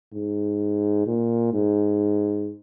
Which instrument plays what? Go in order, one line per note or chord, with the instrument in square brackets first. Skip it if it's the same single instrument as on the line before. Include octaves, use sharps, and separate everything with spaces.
[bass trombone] G#2
A#2
G#2